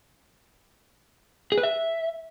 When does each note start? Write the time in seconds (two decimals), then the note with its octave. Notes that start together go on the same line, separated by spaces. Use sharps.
1.52 G#4
1.58 B4
1.63 E5